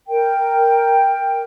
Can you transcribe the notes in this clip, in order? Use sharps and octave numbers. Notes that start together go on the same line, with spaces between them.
A#4 G5